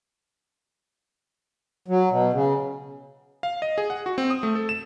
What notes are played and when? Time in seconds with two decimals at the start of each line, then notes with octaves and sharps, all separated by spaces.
1.88 F#3
2.10 B2
2.33 C#3
3.43 F5
3.62 D#5
3.78 G#4
3.90 F#5
4.06 F#4
4.18 C4
4.30 D#6
4.43 A3
4.55 A4
4.69 E7